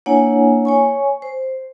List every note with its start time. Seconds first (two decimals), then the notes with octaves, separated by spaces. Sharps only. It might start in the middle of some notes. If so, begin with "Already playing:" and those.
0.06 A#3 D4 E4 C#5 F#5 G#5
0.65 C#5 G#5 C#6
1.22 C5